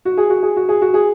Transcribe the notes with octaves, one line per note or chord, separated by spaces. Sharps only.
F#4
G#4
F#4
G#4
F#4
G#4
F#4
G#4